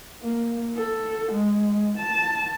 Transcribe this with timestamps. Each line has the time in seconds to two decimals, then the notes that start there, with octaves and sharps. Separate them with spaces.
0.22 A#3
0.76 A4
1.32 G#3
1.98 A5